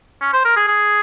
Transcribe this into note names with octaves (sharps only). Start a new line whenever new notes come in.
C#4
C5
A#4
G#4
G#4